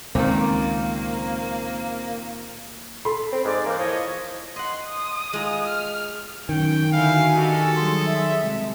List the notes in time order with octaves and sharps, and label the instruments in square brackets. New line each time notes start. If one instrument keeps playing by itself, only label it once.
[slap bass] C#2 [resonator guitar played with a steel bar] A#2 D#3 [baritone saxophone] A#3 [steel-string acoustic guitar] C4
[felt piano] A4 B5 C6
[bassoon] C4
[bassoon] G#2 [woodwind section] G#4 D5
[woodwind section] E3 G3 [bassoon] A#3
[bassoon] F3 [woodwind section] E4 C#5 D#5
[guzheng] D#5 F#5 [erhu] C6
[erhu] D#6
[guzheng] G#3 F4 A#5
[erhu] F6
[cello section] F#2 C#4 [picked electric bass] D#3 [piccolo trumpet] G5
[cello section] D3 E4 F#4 [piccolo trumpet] F5 [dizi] G#5
[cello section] D#4 F#4 G4 [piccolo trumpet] A4
[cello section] F#3 G3 G#4 [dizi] C6
[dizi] E5
[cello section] C3 G#3